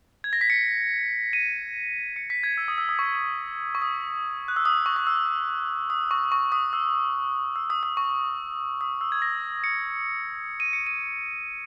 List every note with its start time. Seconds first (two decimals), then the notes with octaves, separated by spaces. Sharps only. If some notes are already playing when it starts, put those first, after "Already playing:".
0.24 G#6
0.33 A#6
0.41 B6
0.50 C#7
1.33 D#7
2.16 C#7
2.30 B6
2.44 G#6
2.57 E6
2.68 D#6
2.78 E6
2.89 D#6
2.99 C#6
3.15 C#6
3.75 C#6
3.82 D#6
4.48 F#6
4.56 E6
4.65 D#6
4.86 C#6
4.96 D#6
5.07 E6
5.90 D#6
6.11 C#6
6.32 C#6
6.52 D#6
6.73 E6
7.56 E6
7.70 D#6
7.83 D#6
7.97 C#6
8.81 D#6
9.01 E6
9.12 G#6
9.22 A#6
9.64 C#7
10.60 D#7
10.73 C#7
10.87 D#7